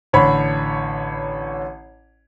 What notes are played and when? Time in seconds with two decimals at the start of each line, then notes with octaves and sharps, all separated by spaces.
0.13 A1 D3 C#5 B5